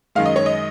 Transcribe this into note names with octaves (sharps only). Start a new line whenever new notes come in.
F#2 D#3 G#3 F5
D#5
C#5
D#5